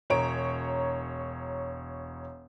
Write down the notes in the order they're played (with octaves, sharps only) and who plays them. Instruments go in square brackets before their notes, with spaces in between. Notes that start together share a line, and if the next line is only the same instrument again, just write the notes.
[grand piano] E1 C#5 A#5 D7